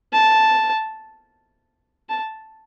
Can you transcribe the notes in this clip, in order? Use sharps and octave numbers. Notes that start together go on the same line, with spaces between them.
A5
A5